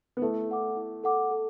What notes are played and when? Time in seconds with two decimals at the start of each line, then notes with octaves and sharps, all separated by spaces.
0.17 B3
0.22 A3 E4
0.49 A4 F#5 D6
0.76 E4
1.04 A4 F#5 D6
1.31 A4